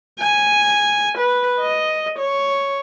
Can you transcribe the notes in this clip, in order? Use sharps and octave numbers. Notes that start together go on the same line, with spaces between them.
G#5
B4
D#5
C#5